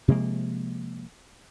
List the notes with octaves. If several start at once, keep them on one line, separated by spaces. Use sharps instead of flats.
C3 F3 G#3 A#3